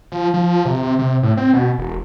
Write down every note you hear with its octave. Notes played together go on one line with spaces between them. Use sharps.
F3
F3
C3
C3
C3
A2
C4
B2
E1